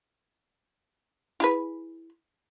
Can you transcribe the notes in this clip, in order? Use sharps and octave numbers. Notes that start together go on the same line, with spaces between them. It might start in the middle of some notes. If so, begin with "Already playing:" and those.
E4 G#4 B4